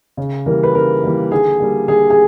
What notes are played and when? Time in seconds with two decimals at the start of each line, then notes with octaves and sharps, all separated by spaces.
0.17 C#3
0.46 E3 G3 A#3 A#4
0.63 B4
0.75 C#3 A#4
1.03 E3 G3 A#3
1.31 D3 G#4
1.60 G3 A#3
1.88 D3 G#4
2.10 G#4